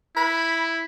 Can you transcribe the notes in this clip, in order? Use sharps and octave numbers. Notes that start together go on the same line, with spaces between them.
E4 B5